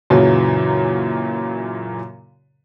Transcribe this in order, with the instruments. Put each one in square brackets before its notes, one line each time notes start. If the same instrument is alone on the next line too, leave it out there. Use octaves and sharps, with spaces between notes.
[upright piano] F#2 A#2 C#3 E3 F#3